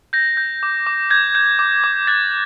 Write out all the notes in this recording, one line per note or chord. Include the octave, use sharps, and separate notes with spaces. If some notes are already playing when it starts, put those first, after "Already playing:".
G6 A#6
G6
D6
D6
G6 G#6
G6
D6
D6
F#6 A6